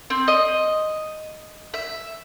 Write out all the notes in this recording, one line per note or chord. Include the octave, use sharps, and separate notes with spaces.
C4
D#5
E5